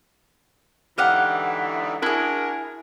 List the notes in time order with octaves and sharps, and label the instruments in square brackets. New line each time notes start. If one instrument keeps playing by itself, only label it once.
[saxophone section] G#2 D3 E3 [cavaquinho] G4 F5 F#5
[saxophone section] D4 F#4 A#4 [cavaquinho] E4 G#4